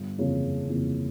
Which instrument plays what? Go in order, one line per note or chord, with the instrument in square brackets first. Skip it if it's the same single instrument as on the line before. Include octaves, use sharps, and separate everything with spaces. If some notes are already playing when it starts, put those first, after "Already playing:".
Already playing: [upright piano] G1
F2 C#3 E3 A#3
G1
F2 C#3 E3 A#3